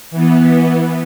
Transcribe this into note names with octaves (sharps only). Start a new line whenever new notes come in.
E3 B3